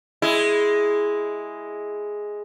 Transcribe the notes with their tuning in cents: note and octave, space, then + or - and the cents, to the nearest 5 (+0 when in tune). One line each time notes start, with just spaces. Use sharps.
G#3 +0 E4 +0